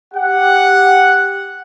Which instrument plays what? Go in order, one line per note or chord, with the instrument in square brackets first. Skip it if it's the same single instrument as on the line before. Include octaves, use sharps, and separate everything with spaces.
[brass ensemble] G4 F#5